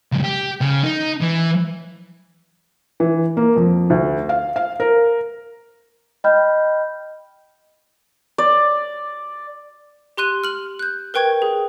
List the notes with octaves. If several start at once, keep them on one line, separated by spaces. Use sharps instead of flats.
C#2 F#2
G4
C#3
D#4
E3
E3
A#3
F2
D2
F5
F5
A#4
D#5 G5 B5 F6 G6
D5
G4 C6 F#6 D#7
F6 F#7
F#6 G6
A#4 B4 G5 C#6 G#6
G#4